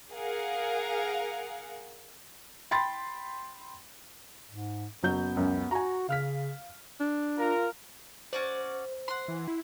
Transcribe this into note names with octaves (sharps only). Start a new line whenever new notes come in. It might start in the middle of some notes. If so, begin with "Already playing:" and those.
G#4 A#4 F5 F#5
G5 B5 C6 A6
G#2
F#1 F#3 B3 G6
C#2 F#2
F#4 G#5 A#5
C#3 F5 F6 B6
D4
F4 A#4
C#4 F#4 C5 D5
F#5 C6
E3
E4